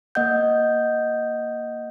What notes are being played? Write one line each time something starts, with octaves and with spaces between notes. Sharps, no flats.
A#3 D#5 F#5 G6